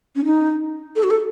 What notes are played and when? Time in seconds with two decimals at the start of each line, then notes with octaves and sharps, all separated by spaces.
0.16 C#4
0.25 D#4
0.96 A4
1.03 F#4
1.10 A4